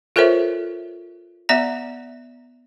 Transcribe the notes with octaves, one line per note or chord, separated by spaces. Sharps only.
F4 A4 A#4 C5 C#5 E5
B3 D5 E5 A#5